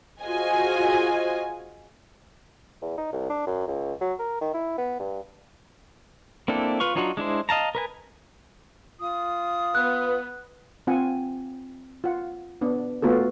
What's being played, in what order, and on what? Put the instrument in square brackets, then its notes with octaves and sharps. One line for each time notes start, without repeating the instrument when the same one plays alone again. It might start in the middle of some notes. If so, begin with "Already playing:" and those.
[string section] F4 F#4 G#4 C5 D#5 G#5
[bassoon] E2
D#4
C2
D4
F#2
C#2
F#3
A#4
D#3
E4
B3
G2
[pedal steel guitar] A#3 C4 D4 E4 A4
F4 B4 F5 C#6
F#3 D4 D#4 F4 F#4
G#3 D4 E4 C5
D#5 F5 A5 A#5
A#4 B4 G#5
[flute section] F4 D#6
[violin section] B3 [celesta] F#6
[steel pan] C4 F4 F#5 G#5
F4 F#5
B3 D4
A3 B3 F4 F#4 A4